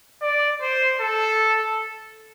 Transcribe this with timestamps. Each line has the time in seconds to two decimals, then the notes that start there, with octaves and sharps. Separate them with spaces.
0.22 D5
0.61 C5
1.01 A4